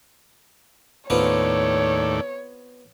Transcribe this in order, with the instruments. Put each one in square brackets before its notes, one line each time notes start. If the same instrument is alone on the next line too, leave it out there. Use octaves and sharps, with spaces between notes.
[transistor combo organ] D#2 A2 D5 [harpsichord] B3 C4 F4 [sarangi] C#5